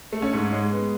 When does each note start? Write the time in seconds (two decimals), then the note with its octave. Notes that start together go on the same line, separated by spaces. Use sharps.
0.13 A3
0.22 C#4 C#5
0.33 G#2
0.52 G#3
0.72 B3